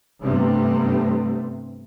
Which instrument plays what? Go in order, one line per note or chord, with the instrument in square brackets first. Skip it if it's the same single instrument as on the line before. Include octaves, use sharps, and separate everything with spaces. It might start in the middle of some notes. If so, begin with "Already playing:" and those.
[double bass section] G2 C3 G3 A3 B3 C4